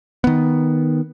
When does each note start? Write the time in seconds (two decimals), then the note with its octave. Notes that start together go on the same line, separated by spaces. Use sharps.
0.24 D#3 B3